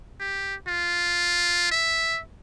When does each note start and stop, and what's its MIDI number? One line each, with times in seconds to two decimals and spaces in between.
0.20 0.55 67
0.67 1.71 65
1.71 2.20 76